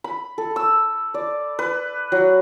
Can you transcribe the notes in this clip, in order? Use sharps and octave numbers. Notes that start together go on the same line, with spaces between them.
B5
A4
E6
D5
B4
F#3